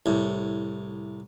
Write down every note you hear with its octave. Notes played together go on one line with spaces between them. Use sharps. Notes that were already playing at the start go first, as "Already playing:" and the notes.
C2 A2